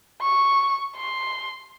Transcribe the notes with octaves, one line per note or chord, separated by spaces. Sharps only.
C#6
C6